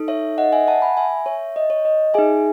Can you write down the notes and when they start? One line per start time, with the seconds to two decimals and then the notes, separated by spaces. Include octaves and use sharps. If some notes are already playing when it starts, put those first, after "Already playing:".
Already playing: D#4 A4
0.08 C#5 E5
0.38 D#5 F#5
0.52 E5 G#5
0.67 F#5 A5
0.82 G#5 B5
0.97 E5 G#5
1.26 C#5 E5
1.56 D#5
1.70 C#5
1.85 D#5
2.14 D#4 G#4 E5 G#5